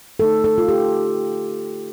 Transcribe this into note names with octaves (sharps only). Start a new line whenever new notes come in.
D3 A3 D#4 A4
A4
F4
G4